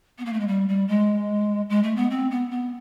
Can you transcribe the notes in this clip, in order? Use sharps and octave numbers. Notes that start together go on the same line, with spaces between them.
B3
A#3
A3
G#3
G3
G3
G#3
G#3
A3
B3
C4
B3
B3